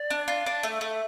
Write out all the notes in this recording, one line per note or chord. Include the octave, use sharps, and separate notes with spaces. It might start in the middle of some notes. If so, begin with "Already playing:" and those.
Already playing: D5
D4
F4
D4
A3
A3 E5